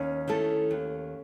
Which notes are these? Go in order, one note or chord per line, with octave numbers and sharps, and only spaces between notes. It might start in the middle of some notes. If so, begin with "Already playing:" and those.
Already playing: D#2 C#4
D#3 A3 E4 A4
D#2